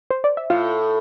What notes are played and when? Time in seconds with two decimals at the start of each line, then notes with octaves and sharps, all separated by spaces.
0.10 C5
0.24 D5
0.37 E5
0.50 A2 F4 F5